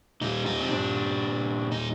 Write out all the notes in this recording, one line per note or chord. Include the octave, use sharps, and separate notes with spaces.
A#2 G3 D#4
D#4
C4
D4
D#4